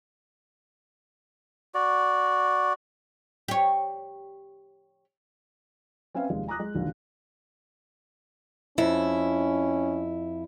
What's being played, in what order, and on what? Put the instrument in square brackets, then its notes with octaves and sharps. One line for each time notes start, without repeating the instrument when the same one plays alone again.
[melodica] F#4 D5
[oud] G4 C#5
[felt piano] C4 C#4 B4 E5 F5
F1 D#2 G#3 F5
G#5 A#5 D6 D#6 F#6 A#6
G#3
E1 A#1 D#2 D3
[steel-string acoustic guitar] F2 E4 [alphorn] C#4